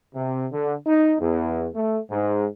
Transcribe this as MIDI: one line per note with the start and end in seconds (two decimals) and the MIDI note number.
0.15 0.46 48
0.52 0.74 50
0.87 1.15 63
1.20 1.66 40
1.75 1.99 57
2.10 2.47 44